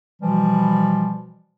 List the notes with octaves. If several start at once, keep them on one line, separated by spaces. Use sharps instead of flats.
B2 E3 F3 G3